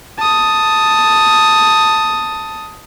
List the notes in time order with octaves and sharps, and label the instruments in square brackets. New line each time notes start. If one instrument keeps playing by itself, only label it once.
[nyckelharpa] A5 D#6